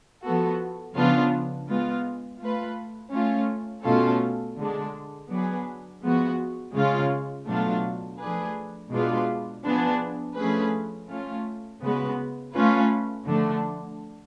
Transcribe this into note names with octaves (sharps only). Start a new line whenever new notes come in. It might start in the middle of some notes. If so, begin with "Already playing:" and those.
F3 B3 F#4 A4
C#3 F3 B3 D4 F4
G#3 B3 F4
A3 F4 B4
A3 C#4 F4
B2 A3 C#4 F4 A4
D3 G#3 D4
F#3 B3 D4 G#4 B4
F3 G#3 B3 F#4
C#3 G#3 C#4 F4
B2 F#3 A3 D4 F4
F3 A3 D4 G#4 B4
B2 G#3 D4 F4 B4
F3 B3 D4 G#4
F3 A3 C#4 G#4 B4
A3 C#4 F4
C#3 G#3 B3 F#4 B4
A3 C#4 F4 B4
D3 F3 A3 D4